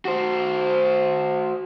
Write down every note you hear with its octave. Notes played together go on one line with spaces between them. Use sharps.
F#4 C5